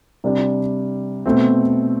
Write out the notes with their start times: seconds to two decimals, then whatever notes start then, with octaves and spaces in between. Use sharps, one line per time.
0.24 C3 G3 D4
1.26 B2 A3 C4